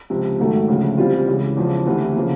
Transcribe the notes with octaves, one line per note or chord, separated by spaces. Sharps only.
C#2 C3 F3
G#2 D#3 F#3 A3
D2 C#3 F3
E3 G3 C4 F4
C#2 C#3 E3
E2 C#3 F3
D2 C3 E3
C#3 F3 A#3